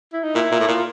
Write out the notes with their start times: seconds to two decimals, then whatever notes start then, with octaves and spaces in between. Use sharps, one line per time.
0.13 E4
0.23 D#4
0.35 A#2 E4
0.51 A#2
0.60 A2
0.68 A#2 F4